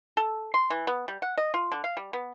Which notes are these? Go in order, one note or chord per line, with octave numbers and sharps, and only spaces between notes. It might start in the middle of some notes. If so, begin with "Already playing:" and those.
A4
C6
E3
B3
G3
F#5
D#5
F4
D3
F5
G3
B3